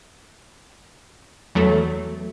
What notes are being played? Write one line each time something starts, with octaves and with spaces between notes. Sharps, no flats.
E2 F#3 A3